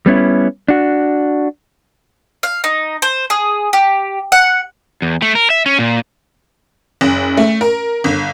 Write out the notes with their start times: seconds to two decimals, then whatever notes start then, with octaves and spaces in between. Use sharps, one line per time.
0.06 G3 B3 C#4 E4
0.68 D4 F#4
2.43 F5
2.64 D#4
3.02 C5
3.30 G#4
3.73 G4
4.32 F#5
5.02 E2
5.22 A3
5.35 A#4
5.50 E5
5.66 C#4
5.79 A#2
7.01 F#1
7.37 A3
7.61 A#4
8.04 G1